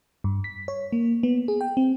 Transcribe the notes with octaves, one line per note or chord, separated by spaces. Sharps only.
G2
B6
C#5
A#3
B3
G#4
G5
C4